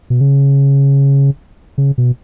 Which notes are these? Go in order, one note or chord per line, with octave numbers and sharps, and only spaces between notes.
B2
C#3
C#3
B2